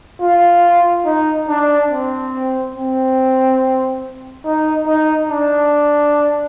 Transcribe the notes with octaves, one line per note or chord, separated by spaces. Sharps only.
F4
D#4
D4
C4
C4
D#4
D#4
D4